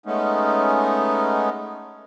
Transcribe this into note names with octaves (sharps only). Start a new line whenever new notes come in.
G#3 A3 B3 C#4 D#4